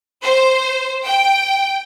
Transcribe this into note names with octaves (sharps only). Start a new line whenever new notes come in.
C5
G5